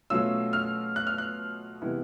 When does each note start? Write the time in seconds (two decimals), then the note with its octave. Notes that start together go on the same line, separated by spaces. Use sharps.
0.10 B2 F#3 A3 C#4 F4 E6
0.53 F6
0.96 F#6
1.07 F6
1.18 F#6
1.82 C3 E3 G#3 B3 E4